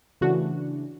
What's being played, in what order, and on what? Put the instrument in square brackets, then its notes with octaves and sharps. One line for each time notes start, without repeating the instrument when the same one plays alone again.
[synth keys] C#3 E3 A3 D4 F#4